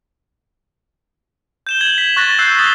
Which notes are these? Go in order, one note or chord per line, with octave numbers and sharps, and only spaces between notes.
G6 E7 G7
G#6 F#7
B6
C#6 F#6 A6 A#6
E6 F#6 G6 C7
D#6 F#6 A6 C7 G7